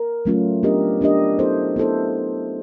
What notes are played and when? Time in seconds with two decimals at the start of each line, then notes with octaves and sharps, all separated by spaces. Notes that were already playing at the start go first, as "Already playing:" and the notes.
Already playing: A#4
0.25 F#3 A3 C#4 F4 A#4
0.63 B3 D4 G4 A#4 D#5
1.01 B3 D4 G4 A#4 D#5
1.39 B3 E4 A4 C5
1.76 B3 E4 A4 C5